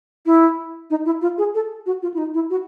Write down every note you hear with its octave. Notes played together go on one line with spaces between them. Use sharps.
E4
D#4
E4
F4
G#4
A4
F#4
F4
E4
D#4
E4
F#4